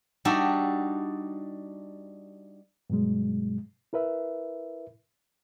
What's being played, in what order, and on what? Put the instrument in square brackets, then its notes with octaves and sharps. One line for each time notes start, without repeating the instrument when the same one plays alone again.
[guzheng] G3 D4 D#4 F#4 E5
[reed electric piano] G2 B2 F#3 G#3
E4 A#4 B4 E5